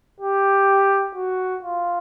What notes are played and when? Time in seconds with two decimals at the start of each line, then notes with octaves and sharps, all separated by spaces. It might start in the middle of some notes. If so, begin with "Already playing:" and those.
0.20 G4
1.15 F#4
1.63 F4